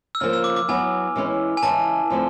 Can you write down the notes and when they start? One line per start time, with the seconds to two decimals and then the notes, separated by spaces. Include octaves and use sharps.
0.15 E6
0.20 C#3 F3 A#3 F6
0.33 E6
0.44 D6
0.56 D6
0.68 F#3 B3 E4 G#5
1.16 E3 G#3 C#4 E4
1.57 G#5
1.62 C#3 E3 G#3 A5
2.10 D3 F3 A3 C4